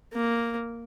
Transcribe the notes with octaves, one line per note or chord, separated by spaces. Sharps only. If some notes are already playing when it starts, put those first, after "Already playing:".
A#3